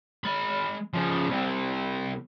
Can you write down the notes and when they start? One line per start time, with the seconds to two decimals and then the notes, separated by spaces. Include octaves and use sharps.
0.24 G#3 B5
0.94 C#3 F3
1.29 C2 C3